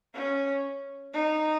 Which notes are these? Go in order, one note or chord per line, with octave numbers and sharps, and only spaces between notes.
C#4
D#4